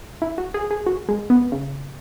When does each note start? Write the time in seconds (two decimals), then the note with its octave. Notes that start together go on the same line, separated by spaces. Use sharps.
0.22 E4
0.38 F#4
0.54 G#4
0.71 G#4
0.86 F#4
1.09 G#3
1.30 B3
1.52 C#3